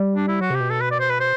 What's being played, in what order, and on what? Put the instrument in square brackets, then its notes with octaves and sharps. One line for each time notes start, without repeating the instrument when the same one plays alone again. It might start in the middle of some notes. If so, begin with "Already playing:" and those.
Already playing: [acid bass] G3
[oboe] D4
E4
[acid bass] F#3 [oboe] F#4
[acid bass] C3 [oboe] G4
[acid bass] B2
[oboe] A4
B4
D5
C5
B4
C5